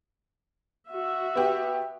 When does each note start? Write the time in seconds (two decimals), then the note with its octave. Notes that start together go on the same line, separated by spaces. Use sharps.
0.90 F#4 E5
1.36 B3 G4